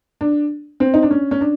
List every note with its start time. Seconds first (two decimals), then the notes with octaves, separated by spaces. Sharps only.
0.21 D4
0.80 C4
0.94 D#4
1.03 D4
1.11 C#4
1.31 C#4
1.41 D4